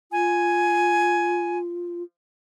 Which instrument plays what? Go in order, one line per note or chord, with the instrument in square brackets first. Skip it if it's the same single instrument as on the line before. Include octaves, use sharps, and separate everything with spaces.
[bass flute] F4 [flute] G#5